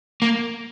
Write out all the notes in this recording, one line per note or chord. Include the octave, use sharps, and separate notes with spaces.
A#3